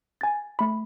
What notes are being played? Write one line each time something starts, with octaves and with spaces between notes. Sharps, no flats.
G#5 A6
A3 B5